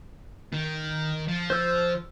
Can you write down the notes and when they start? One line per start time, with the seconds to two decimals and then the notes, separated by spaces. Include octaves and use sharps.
0.53 D#3
1.28 F3
1.50 C5 E6